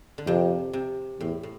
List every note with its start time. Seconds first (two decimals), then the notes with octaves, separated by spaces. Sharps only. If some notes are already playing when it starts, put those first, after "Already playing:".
0.18 D3
0.27 F2 C3
0.73 C3
1.20 E2 A2
1.43 A2